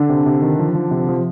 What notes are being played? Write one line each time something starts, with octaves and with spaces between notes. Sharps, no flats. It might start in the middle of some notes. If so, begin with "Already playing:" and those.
Already playing: D3 D4
C3
C3
D#3
F3
F3
C3
F3